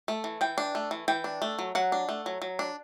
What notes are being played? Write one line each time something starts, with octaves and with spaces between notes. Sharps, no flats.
A3
E3
E3 G5
D4
A3
E3
E3 G5
D4
A3
F#3
F#3 F#5
D4
A3
F#3
F#3
D4